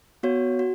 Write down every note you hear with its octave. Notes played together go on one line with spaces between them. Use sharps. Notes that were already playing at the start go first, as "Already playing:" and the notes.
B3 F#4 C#5
F#4